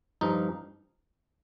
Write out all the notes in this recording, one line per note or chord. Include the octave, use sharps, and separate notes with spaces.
G2 F3 D#4